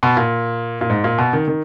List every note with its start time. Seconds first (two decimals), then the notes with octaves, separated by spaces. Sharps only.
0.03 B2
0.17 A#2
0.81 A#2
0.90 G#2
1.04 A#2
1.18 B2
1.33 D#3
1.48 D#3